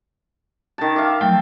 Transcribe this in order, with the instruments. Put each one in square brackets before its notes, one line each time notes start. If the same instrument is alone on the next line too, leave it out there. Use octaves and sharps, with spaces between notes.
[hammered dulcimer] D#3 A5
[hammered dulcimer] E5 F5 [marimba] D6
[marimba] F3 F#3 A3 [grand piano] G5